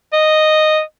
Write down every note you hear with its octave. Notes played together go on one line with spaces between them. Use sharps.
D#5